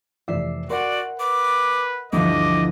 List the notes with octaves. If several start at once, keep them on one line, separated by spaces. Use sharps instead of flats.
F1 E3 D5 E5 C7
F#4 A#4 D5 F#5 C6
B4 D6
D2 G2 E3 F3 D#5 D6